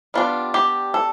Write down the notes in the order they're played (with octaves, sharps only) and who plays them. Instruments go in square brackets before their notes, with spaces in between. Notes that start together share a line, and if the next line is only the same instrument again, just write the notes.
[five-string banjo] G3 B3 D4 F4
G4
A4